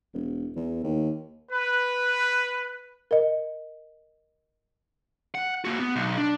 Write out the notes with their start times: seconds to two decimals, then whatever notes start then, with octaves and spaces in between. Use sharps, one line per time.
0.14 E1
0.56 E2
0.84 D#2
1.51 B4
3.11 A#4 D#5
5.35 F#5
5.65 A#3 F#4
5.79 B3
5.96 B1
6.18 D4